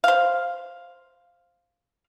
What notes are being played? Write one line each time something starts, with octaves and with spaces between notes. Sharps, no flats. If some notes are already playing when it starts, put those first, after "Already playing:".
C5 F5